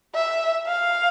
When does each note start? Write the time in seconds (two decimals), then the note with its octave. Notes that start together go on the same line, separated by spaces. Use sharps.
0.15 E5
0.67 F5